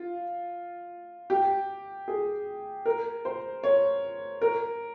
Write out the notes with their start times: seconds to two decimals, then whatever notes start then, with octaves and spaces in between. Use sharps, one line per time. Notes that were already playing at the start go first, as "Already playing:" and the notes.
Already playing: F4
1.30 G4
2.08 G#4
2.86 A#4
3.25 C5
3.64 C#5
4.42 A#4